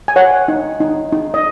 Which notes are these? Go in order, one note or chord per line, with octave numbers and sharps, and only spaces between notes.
G#5
C#5 F#5
D#4
D#4
D#4
D#5